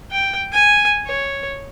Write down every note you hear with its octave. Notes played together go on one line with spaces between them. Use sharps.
G5
G#5
C#5